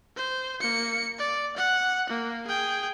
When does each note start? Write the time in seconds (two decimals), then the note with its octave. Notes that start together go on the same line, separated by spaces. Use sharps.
0.16 C5
0.61 A#3 C#7
1.19 D5
1.56 F#5
2.09 A#3
2.47 G#4 G5